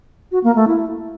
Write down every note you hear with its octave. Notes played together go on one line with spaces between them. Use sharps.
F#4
A#3
A3
E4